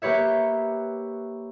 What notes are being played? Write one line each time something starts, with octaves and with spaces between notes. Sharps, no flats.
A#3 G4 B4 C#5 E5